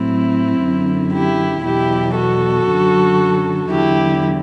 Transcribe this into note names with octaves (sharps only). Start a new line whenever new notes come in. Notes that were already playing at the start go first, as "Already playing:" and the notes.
Already playing: A2 F#3 C4 E4
F#2 D3 F#3
E4 G4
E2 B2 F#3 E4 G4
F#4 A4
F#2 D3 F#3
E2 D3 F#3 E4 G4